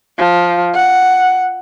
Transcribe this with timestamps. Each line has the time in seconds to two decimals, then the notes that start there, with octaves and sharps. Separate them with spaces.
0.18 F3
0.75 F#5